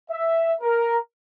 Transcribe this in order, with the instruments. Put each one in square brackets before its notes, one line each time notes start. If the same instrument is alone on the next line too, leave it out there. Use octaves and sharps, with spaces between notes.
[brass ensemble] E5
A#4